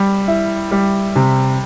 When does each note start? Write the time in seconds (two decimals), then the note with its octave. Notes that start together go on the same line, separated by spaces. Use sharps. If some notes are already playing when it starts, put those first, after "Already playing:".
Already playing: G3
0.28 E4
0.71 G3
1.16 C3